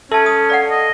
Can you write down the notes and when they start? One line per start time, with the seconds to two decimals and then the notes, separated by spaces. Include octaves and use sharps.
0.12 C#4 A4 E5 A5
0.26 D#6
0.50 D5 F5 F#5
0.70 D#5